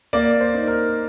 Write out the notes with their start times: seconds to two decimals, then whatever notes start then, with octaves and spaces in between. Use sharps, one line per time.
0.13 A#3 D5
0.40 C5
0.54 D#4
0.68 A#4